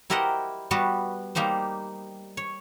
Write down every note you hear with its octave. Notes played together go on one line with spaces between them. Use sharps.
E4 G4 A#4 C5 D#5 F#5
G3 B3 F#4 B4 A5
G3 A#3 D#4 G4 C5
C#5